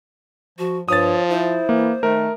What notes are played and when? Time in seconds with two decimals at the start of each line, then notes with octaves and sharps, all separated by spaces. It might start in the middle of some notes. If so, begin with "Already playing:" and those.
0.59 F3 F#4
0.89 G2 F3 C#5 D#6 A6
1.30 E4 C5
1.69 E3 A#3
2.03 D#3 A3 A#4